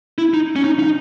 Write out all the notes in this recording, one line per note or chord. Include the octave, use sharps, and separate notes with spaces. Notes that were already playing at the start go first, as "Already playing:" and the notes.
E4
D#4
C#4
D#4
D#4